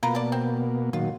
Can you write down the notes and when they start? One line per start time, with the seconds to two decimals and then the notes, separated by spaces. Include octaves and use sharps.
0.03 B2 A#3 F4 A#4 B4
0.15 D5 A5
0.32 C4
0.93 A#2 D#3 F#3 F4